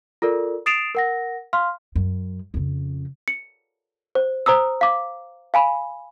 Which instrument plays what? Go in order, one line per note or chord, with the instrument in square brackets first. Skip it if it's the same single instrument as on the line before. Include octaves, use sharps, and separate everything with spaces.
[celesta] F4 A4 A#4 D5
D#6 A6 C7 D7 E7 F7
A#4 F#5 A#6
F5 C6 F6
[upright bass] F#2
F2 C#3
[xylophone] C#7
C5
C5 A#5 D#6 E6
F5 D6
F5 G#5 B5